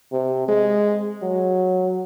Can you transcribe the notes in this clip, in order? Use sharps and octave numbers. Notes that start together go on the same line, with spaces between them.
C3
G#3
F#3